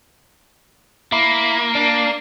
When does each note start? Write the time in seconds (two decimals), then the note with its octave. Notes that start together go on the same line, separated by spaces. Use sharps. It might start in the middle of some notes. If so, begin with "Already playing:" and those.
1.12 A#3 E4
1.75 D4